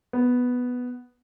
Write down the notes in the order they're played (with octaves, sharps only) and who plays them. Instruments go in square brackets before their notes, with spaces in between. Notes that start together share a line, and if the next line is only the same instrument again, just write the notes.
[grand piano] B3